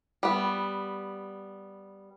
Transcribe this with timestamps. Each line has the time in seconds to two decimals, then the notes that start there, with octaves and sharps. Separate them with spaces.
0.23 G3 B3